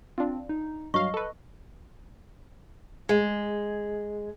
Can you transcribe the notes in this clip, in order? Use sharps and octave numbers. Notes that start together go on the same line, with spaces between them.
C4 D4 F4
D#4
G2 F#3 D#5 F5 C#6
A4 B4
G#3